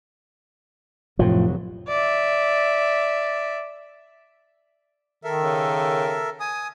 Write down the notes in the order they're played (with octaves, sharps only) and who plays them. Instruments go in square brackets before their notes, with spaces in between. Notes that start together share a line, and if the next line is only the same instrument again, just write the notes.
[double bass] F1 F#3 [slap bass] A2 F3
[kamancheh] D5 E5
[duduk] D#3 [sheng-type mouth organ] A4 A#4 E5
[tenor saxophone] C#3
[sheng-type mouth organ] G#5 D#6